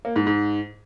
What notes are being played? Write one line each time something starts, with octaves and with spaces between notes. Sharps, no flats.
A#3
G#2
G#2